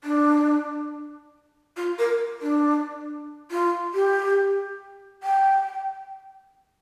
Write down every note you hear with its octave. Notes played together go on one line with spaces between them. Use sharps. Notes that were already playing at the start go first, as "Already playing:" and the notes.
D4
F4
A#4
D4
F4
G4
G5